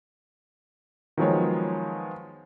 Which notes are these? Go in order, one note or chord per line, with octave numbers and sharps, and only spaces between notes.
D#3 F3 F#3 G#3 B3 C#5